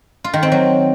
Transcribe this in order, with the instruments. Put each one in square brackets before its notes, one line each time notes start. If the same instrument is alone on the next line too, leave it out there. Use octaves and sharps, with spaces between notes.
[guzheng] F4
D#3
C4
F#3